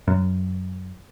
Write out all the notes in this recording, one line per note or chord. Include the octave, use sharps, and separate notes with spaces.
F#2